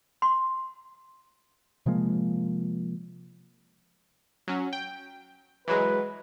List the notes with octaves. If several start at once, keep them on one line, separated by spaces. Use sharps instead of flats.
C6
C3 F3 G#3 A#3
F#3 C#4
G5
E3 F#3 G#3 B4